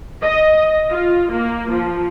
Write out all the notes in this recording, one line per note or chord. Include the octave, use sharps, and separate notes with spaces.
D#5
F4
A#3
F3